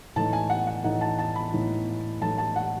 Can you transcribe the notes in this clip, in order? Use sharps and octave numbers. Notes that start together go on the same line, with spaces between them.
A2 E3 A3 D#4 A5
G#5
F#5
F#5
A2 E3 A3 D#4 F#5
A5
A5
B5
A2 E3 A3 D#4
A2 E3 A3 D#4 A5
A5
F#5